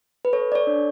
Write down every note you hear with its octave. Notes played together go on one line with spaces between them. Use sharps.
B4
A4 C#5
D5
C#5
D4